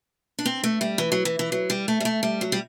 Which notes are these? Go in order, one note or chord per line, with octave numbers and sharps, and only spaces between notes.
D4
C4
A3
G3
E3
F#3
E3
E3
F#3
G3
A3
G3
A3
G3
F#3
G3